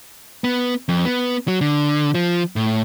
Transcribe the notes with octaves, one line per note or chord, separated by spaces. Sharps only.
B3
F2
B3
F#3
D3
F3
A2